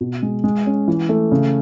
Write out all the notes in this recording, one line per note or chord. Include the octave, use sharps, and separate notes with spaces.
B2
G#3
G#3
C#4
E3
A3
C#3